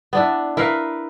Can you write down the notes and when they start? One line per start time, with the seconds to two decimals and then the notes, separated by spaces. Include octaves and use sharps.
0.13 B3 D4 E4
0.57 E4 A#4 B4 F5